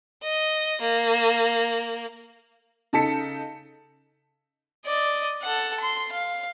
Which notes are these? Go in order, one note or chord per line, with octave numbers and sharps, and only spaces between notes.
D#5
A#3
C#3 D#4 A4 A5 B6 C#7
D5 D#5
A4 F#5
C6
F5